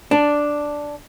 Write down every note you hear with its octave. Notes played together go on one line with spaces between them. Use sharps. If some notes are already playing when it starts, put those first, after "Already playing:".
D4